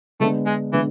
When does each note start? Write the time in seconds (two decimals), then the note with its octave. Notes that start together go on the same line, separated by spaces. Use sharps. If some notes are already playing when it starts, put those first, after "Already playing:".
0.20 D3 G#3 A3 B3 D4
0.46 G#3
0.73 D3 E3 G#3 B3